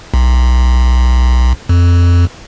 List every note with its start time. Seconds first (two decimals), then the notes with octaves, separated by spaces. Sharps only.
0.14 B1
1.69 F2